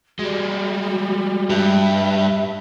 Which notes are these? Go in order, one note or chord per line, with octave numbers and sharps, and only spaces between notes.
G3 G#3 F#4
G2 E5